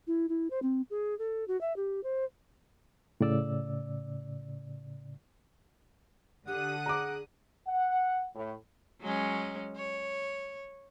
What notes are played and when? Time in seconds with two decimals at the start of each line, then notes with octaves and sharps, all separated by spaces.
0.07 E4
0.29 E4
0.50 C5
0.62 C4
0.90 G#4
1.19 A4
1.48 F#4
1.61 E5
1.76 G4
2.03 C5
3.21 A2 C#3 D5 E6
6.48 D3 G4 F#5 D#6 F#6
6.86 G#4 A#5 D6
7.67 F#5
8.35 A2
9.01 F#3 G#3 C#4
9.76 C#5